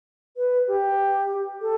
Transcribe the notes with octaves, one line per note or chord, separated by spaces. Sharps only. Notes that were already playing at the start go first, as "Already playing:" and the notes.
B4
G4
A4